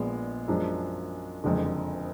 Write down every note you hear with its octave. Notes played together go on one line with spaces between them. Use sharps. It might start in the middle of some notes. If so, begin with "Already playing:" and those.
Already playing: A#1 A#2 G#3 B3
F#2 F3 G#3 D4
F#1 F2 D3 G#3